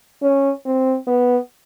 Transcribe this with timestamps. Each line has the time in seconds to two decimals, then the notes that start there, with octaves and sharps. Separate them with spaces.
0.22 C#4
0.65 C4
1.07 B3